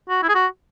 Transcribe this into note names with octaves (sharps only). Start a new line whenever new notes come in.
F#4
E4
G#4
F#4